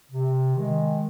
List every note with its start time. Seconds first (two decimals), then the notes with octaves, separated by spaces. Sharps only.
0.10 C3
0.56 D#3 G#3